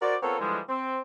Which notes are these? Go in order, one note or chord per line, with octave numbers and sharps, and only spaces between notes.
F#4 A#4 C5 D5
B3 C4 F4 A4 A#4 C#5
D3 E3 F3 G3 G#3
C4